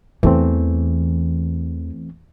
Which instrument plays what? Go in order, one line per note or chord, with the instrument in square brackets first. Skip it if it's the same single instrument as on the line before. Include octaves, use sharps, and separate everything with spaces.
[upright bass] E2 [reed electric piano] E3 A3 C4